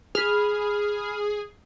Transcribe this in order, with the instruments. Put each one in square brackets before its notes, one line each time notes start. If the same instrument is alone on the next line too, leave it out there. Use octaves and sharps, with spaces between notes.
[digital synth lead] G#4 [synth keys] B5 F6